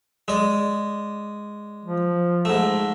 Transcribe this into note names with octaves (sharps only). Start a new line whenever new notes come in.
G#3 D5
F3
G#2 A3